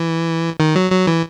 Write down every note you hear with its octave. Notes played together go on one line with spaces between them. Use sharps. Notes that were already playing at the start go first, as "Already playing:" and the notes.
Already playing: E3
D#3
F#3
F#3
E3